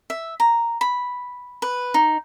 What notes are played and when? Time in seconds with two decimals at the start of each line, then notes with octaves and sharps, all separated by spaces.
0.10 E5
0.40 A#5
0.81 B5
1.62 B4
1.94 D#4